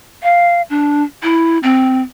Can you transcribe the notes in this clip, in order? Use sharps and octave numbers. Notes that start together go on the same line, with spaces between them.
F5
D4
E4
C4